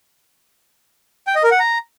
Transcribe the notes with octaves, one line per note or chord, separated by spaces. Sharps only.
G5
D#5
A#4
F#5
A#5